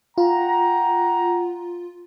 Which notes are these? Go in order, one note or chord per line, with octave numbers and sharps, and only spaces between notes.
F4 F#5 G5 A#5